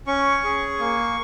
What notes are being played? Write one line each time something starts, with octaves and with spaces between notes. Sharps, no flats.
C#4 C#6
G#4
A#3